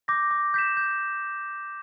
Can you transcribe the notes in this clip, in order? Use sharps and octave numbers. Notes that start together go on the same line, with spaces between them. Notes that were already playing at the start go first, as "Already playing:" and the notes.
D6 G6 A#6
D6
G6 B6 E7
G6